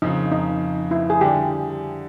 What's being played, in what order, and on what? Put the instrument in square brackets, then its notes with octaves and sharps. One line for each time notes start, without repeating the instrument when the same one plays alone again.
[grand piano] F2 C#3 F3 [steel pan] D#4
[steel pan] D#4
E4
G#4
[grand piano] D3 G3 [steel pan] G4